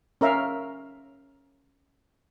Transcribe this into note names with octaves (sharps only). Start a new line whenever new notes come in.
C#4 A#4 E5 F5